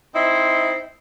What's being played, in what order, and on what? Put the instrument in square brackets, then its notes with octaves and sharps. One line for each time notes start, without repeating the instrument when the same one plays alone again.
[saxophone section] C4 D#4 E4 C5